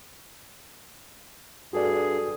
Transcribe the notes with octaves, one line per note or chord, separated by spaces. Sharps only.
G2 F#4 G#4 A4 D5